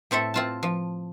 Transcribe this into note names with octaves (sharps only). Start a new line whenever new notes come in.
A2 C4 A4 E5
C4 F4 A5
F3